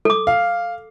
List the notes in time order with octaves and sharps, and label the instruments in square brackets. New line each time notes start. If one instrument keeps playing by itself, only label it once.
[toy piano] A4 D6
[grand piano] F5